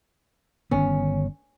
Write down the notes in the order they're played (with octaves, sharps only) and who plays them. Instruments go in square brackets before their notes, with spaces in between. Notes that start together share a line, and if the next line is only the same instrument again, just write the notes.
[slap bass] G1 D#3 B3 [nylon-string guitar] C#4